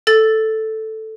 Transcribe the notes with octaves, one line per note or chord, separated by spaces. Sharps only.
A4 A6